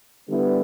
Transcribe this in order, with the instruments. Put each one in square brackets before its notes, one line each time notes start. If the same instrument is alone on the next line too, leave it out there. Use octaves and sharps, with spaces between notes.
[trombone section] D3 G3 B3 E4